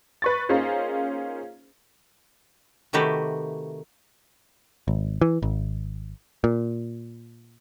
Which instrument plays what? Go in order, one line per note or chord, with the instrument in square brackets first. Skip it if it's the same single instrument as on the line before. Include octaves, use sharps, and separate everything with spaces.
[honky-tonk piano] B4 C#6 A6
A#3 C#4 D#4 F4 G#4 C5
[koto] C3 D#3 A3 F#4 G4 B4
[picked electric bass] G#1
E3
G#1
A#2